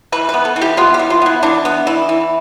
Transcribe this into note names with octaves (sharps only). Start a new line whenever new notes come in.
E3 B4
B4
B3
A4
E3
G4
B3 F4
G4
E3
F4
B3 E4
E3 D4
B3
E3
E3